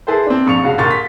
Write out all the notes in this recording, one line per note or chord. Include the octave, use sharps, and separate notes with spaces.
E4 G#4 A4 B4 C5
C4 D4
A#1 F2 C#6 D#6 C#7 F7
C#2 G2 G#3 F#4 F5
D#1 A#4 C6 C#6 A6
B6